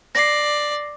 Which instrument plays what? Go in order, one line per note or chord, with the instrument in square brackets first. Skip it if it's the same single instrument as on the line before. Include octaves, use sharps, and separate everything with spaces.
[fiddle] D5 [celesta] A#6 C7